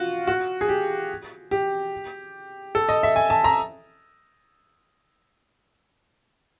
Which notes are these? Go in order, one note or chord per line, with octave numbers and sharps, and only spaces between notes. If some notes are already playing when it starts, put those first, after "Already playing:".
Already playing: F4 F#4
F#4
G#4
G4
G4
A4
D#5
E5
G#5
A5
A#5